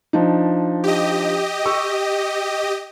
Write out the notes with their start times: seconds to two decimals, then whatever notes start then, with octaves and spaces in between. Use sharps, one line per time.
0.13 F3 D4 D#4
0.84 G4 D#5
1.66 C#6 E6